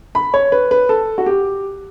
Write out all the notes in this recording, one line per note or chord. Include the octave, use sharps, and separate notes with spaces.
B5
C#5
B4
B4
A4
F#4
G4